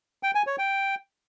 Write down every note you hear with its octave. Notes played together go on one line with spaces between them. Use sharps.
G5
G#5
C#5
G5